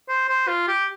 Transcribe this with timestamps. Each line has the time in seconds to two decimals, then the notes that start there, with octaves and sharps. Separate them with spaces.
0.08 C5
0.28 C5
0.48 F4
0.68 G4